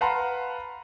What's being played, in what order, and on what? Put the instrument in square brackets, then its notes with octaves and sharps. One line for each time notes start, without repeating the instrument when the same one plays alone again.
[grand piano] B4 F5 F#5 A5 A#5 C6